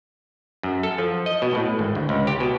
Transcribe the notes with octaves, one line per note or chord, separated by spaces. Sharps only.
F#2
A4
F3
D#5
B2
A2
G#1
D2
C#2
G4
B2